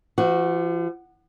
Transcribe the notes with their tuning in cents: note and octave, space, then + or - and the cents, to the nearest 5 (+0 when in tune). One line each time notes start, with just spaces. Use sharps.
F3 -40 F#4 +0